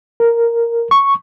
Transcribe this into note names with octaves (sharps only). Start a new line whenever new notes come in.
A#4
C#6